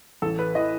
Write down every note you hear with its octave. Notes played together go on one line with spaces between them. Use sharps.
A1 A4
B4
E3 D#5